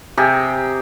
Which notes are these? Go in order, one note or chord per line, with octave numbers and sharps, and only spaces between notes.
C3 G4 G#4 A#5